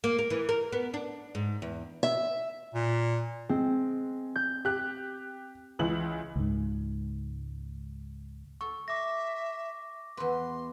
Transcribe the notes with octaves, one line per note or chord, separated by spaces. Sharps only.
A#3
A#4
E3
A#4
B3
D4
G#2
E2
E5
A#2
G#3 C4
G6
G4 F#6
C#2 E3 F#7
C#2 G#2
A4 C#6
E5 D6 A#6
E2 B4 C6